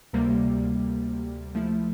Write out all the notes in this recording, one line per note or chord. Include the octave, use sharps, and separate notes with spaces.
D2 C3 G3 A#3
F3 A3 E4